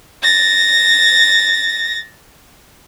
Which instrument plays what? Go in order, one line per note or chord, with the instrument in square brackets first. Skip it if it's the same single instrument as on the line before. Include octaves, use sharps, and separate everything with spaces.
[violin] A6 A#6